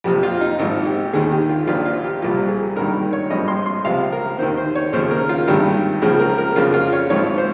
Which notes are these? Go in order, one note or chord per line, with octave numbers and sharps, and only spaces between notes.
F2 C3 F3 G4
F4
D#4
G#1 G#2 F3
G4
D#2 D#3 G#4
G4
F4
A#1 A#2 F3 F4
F4
G4
C2 A#2 F3 G4
G#4
G#1 G2 D#3 A#4
C#5
G#1 G2 F3 D#5
C6
C6
C#2 C3 F3 F5
A#4
D#2 D#3 C5
C5
C#5
D#2 C#3 F3 C5
A#4
F4
G#1 G2 D#3 G4
C#2 C#3 F3 G#4
A#4
A#4
F2 C#3 F3 F4
F4
C#5
G#1 G#2 F3 C#5
C5